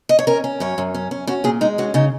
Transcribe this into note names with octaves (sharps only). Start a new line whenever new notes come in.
D#5
C#5
C#4 A#4
C#4
F#2 C#5
F#2
C#4
C#4
C#4 F#4
A#2 G#4
G#3 D#4
C#4 F#4
C#3 D#4